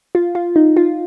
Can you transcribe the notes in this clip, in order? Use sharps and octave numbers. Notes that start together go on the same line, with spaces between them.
F4
F4
D#4
F4